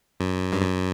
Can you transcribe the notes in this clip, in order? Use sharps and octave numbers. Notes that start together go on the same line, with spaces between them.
F#2
G2
F#2